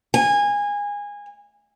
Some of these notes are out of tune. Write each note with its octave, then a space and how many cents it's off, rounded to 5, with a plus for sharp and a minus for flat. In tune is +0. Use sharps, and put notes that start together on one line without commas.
G#5 -20